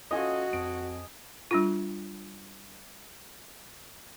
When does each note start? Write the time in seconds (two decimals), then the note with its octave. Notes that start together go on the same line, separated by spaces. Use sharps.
0.11 C#4 F4 F#4 A4 D#5 G#5
0.53 F2 D7
1.51 G3 D4 F4